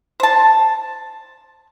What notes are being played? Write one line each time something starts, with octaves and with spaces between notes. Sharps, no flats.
C5 A5